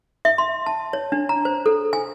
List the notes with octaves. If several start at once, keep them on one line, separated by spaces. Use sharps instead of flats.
E5
C6
A5
C#5
D4
A#5
C5
A4
G#5